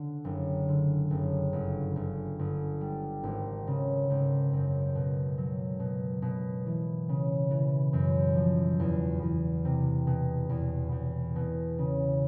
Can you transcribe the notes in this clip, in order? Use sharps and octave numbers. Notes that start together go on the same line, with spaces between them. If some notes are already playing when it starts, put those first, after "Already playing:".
Already playing: D3
F#1
D3
F#1
G1
G1
G1
G3
G#1
C#3
G#1
F#2
B2
F#3
B2
B2
E3
C#3
E3
F#2
F3
E2
E2
C3
B2
E2
E2
B2
C#3